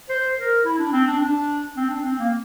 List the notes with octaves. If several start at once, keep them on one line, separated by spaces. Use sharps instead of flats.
C5
A#4
E4
D4
C4
D4
D4
C4
D4
C4
A#3